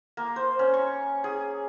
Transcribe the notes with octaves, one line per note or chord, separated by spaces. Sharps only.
A#3
C5
C#4
C#6
G#4